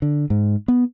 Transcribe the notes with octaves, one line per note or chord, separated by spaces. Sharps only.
D3
G#2
B3